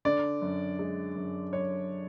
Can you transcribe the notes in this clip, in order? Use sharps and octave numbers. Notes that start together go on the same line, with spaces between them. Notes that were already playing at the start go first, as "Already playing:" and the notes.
D3 D5
F#2
G#3
F#2
F#2 C#5